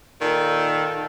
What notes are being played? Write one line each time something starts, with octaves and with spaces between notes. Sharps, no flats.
A#2 D#3 A4